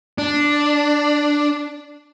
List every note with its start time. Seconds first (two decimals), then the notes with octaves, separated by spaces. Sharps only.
0.18 D4